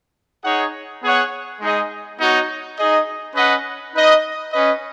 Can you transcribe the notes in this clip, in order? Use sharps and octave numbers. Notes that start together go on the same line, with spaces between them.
D#4 G#4 C#5 F#5
B3 G#4 C#5 F#5
G#3 D#4 G#4 D#5
B3 D#4 F#4 C#5
D#4 G#4 D#5
C#4 B4 D#5 F#5
D#4 B4 D#5
C#4 B4 D#5